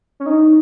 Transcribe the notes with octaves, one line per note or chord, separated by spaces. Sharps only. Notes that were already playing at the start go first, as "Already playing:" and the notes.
C#4
D#4